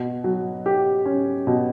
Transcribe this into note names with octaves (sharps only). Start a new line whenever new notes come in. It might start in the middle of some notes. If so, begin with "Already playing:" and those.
Already playing: B2
F#3
G4
C#4
B2